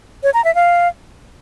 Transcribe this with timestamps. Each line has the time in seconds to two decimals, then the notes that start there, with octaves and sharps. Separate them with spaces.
0.23 C#5
0.34 A#5
0.44 E5
0.55 F5